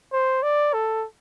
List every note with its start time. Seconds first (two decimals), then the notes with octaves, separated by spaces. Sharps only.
0.12 C5
0.43 D5
0.73 A4